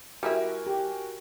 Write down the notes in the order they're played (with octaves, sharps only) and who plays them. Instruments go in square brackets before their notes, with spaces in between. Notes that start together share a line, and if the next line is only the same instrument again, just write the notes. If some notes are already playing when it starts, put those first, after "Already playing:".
[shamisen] G3 E4 E5 [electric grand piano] F#4 A#4 G#5
[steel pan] G4